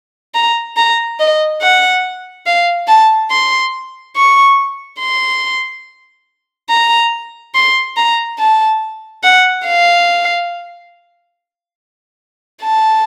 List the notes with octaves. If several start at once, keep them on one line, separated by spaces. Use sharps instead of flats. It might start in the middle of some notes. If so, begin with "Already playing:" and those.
A#5
A#5
D#5
F#5
F5
A5
C6
C#6
C6
A#5
C6
A#5
A5
F#5
F5
A5